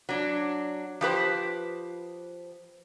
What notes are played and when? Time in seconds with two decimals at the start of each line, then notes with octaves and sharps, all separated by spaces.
0.09 F#3 D4
1.01 F3 G4 B4 C5